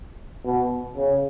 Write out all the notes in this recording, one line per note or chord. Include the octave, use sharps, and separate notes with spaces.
B2
C#3